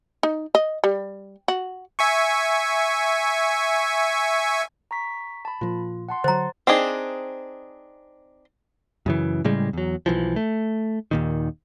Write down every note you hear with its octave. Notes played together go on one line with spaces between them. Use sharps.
D#4
D#5
G3
F#4
E5 G#5 C#6
A#5 C#6 B6
A5 B5
A#2 F3 F4
F#5 A5 C6
D3 F#3 C5 A#5 A6
C4 D4 D#4 G#4
F#2 C#3 E3
A2 C#3 G3 G#3
E2 F#3
B1 E3 F3
A3
D#2 A#2 D#3